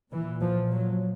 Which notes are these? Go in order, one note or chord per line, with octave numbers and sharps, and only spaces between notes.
A#2 E3
F3
F#3